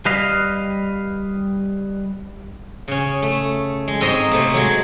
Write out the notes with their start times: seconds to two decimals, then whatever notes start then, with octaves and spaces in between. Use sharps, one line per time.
0.06 G3 B4 D#5 F5
2.88 C#3 C#4
3.22 A3
3.88 G#3
4.00 G#2 C4 C#4 D#5 A#5
4.31 C3 A3 A#3
4.54 F#3 G#3